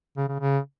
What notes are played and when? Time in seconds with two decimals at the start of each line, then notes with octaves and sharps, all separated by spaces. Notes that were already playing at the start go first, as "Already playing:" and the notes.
0.17 C#3
0.28 C#3
0.40 C#3